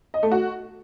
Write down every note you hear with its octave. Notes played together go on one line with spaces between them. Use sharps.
D#5
A3
F#4